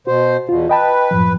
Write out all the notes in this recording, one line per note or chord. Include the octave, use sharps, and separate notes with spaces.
B2 F#4 C5
E2 B2 F4
B4 D#5 G5 A5
F#2 A2 F3